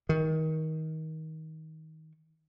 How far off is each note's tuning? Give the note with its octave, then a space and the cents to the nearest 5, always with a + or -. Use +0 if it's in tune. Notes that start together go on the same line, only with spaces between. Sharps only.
D#3 +25